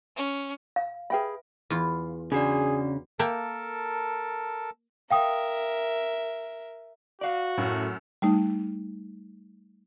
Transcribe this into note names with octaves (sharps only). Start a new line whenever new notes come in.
C#4
F5
G#4 B4 E5 G5 B5
E2 F4
C#3 D4 F#4 G#4 D5
A#3 A4 A#4 E5 G5 A5
A#4 E5 F5 G5 D#6
F#4 D5 F5
F#2 A2
G3 A3 D#4